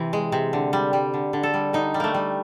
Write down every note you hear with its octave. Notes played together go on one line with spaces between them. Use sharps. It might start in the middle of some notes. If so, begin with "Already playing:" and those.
Already playing: C3 E3
G#3
C3
D3
G3
G3
D3
D3
A4
G3
D3 D#4
G3
A3 A#3
G3